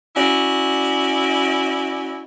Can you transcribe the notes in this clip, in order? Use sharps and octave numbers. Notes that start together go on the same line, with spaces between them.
C#4 E4 F#4 D5